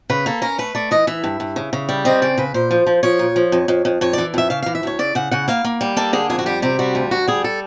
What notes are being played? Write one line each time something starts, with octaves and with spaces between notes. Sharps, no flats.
C#3 B4
A#3 A4
C#4 A#4
A3 B4
A3 D5
E3 D#5
E3 E5
G2
G2
C#3
C#3
G3
C4 D#5
C#3 D5
C#3 B4
A#2 C5
F3
F3
F3 C#5
A#2
F3
F2
F2
F2
F2 C#5
E3 D5
F2 E5
C#3 F5
E3 F5
E5
D2 C#5
C#3 D5
C#3 F#5
C#3 F#5
A#3 F5
A#3
G3
A#3 A4
D3 G#4
F2 G#4
F#4
G3 G4
C3 G4
G3 F#4
D2 F4
D2 F#4
G3 G#4
A4